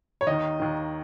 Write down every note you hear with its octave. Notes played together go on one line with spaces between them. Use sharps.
C#5
D#2 D#3 D#5
D#2 D#3